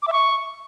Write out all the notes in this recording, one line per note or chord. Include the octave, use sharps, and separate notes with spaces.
D6
E5
C#6